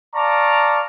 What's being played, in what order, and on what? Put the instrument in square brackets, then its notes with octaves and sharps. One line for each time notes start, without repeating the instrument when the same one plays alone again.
[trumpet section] D5 F5 A5 A#5 C#6 D6